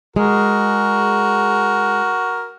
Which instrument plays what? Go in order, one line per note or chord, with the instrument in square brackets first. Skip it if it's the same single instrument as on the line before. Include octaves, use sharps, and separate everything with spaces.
[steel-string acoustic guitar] G#3 G#4 [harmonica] F#4 A#4